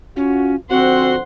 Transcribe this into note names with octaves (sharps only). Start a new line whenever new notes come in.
C#4 F4 F#4
D3 F3 C4 F#4 C5 F#5 C6